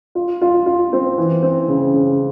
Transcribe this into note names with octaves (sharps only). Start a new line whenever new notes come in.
F4
F4
F4
C4
E3
C4
C#3
C#3